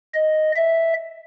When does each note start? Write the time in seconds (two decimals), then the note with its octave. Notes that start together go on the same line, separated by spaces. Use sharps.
0.15 D#5
0.56 E5